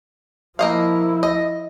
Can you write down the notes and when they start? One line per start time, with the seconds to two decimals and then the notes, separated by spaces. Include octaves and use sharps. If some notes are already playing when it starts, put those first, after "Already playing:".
0.59 F3 A#3 E4 D#5 F5
1.23 D#5